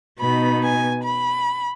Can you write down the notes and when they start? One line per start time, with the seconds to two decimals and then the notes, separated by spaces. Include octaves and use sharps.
0.20 B2 B3 D#4 B5
0.62 G#5
1.03 B5